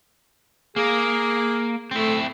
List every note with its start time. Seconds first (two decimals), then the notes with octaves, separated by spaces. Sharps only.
0.76 A#3 G#4 A#4
1.91 A3 C4 E4